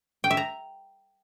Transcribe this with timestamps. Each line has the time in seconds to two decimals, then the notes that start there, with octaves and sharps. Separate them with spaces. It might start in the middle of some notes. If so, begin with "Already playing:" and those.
0.24 G5
0.31 E5
0.37 A#5